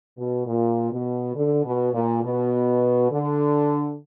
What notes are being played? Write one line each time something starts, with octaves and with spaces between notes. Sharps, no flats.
B2
A#2
B2
D3
B2
A#2
B2
D3